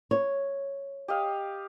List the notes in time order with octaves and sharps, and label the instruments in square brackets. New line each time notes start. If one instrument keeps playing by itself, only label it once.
[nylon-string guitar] C#5
[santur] G4 D#5 F5